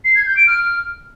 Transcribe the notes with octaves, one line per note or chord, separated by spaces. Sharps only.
C7
G#6
G6
D7
F6